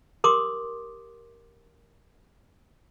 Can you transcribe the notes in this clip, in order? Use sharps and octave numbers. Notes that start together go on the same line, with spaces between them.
G4 A#4 C6 D6 D#6